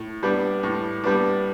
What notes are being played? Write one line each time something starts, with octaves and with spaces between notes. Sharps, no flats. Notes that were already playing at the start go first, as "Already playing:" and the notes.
Already playing: A2
G3 B3 D4
A2
G3 B3 D4